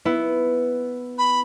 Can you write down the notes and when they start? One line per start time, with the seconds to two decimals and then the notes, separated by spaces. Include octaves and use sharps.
0.05 B3 E4
1.18 B5